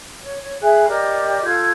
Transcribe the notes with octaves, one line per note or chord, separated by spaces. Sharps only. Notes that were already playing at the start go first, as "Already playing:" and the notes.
C#5
C#5
G#4 E5 G#5 F#6
G4 A#4 D5 D#5
F4 A4 G6 G#6